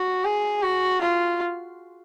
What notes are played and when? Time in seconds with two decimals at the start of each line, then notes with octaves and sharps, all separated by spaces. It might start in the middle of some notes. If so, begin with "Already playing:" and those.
Already playing: F#4
0.24 G#4
0.63 F#4
1.01 F4